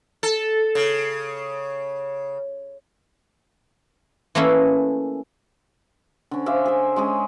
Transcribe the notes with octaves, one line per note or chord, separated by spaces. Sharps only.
A4
C#3
E3 A3 A#3 C#4 E4
D3 C#4
C5 E5 F5 D6
G#4 E5
G#3 C#4 G#4